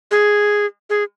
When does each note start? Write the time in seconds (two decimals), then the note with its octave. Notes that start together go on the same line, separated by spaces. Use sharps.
0.11 G#4
0.90 G#4